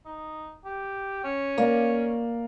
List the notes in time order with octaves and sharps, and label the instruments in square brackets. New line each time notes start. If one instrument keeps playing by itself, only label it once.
[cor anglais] D#4
G4
C#4
[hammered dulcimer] A#3 D5